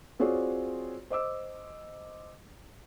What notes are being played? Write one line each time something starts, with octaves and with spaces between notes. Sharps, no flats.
C4 F4 F#4 G#4 C#5 D5
C5 D#5 D6 E6